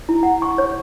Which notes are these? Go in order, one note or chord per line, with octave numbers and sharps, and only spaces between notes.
E4
F#5
C#6
C#5